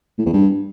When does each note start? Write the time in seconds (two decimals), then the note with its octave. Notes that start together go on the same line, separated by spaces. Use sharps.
0.18 A2
0.26 E2
0.33 G2